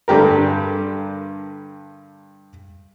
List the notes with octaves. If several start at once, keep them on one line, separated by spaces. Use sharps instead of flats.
G2 D3 G4 A#4